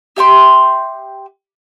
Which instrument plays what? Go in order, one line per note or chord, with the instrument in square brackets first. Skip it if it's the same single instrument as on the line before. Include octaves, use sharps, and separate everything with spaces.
[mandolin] G4 E5 G5 C6